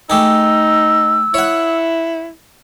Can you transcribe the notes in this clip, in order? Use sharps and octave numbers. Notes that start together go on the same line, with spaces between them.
A3 D#4 G4 G#4 E6
E4 C#5 F#5